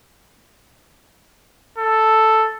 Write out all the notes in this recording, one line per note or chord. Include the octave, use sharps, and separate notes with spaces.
A4